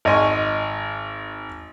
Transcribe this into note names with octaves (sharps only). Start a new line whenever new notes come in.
G#1 D#5 G#5 C6 C#6